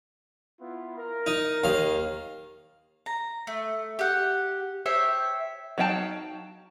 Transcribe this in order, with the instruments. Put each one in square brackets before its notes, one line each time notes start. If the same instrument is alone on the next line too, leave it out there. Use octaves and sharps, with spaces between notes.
[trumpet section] B3 E4 F4
A#4
[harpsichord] D#4
D#2 F5
[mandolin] A#5
A3
G4 F#5
C5 C#5 E5 G5
[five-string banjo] F#3 D#4 F5 G5 A5